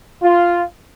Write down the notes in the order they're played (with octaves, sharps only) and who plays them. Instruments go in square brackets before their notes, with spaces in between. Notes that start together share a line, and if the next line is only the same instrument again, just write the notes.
[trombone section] F4